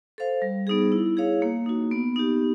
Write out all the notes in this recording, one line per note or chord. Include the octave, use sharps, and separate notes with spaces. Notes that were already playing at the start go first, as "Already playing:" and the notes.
A4 C5 F5
G3
B3 D#4 G#4
E4
G#4 C#5 F5
A#3
D#4 F#4
B3
D#4 G4